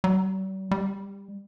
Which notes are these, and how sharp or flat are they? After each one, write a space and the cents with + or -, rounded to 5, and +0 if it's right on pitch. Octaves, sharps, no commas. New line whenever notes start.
G3 -45
G3 +20